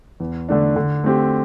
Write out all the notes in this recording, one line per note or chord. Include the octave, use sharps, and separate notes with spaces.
E2
D3 A3 D4
D3
A3 C4 G4